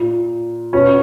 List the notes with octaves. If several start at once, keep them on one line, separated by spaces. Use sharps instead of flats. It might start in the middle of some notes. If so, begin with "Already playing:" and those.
Already playing: A#2
B2 C#4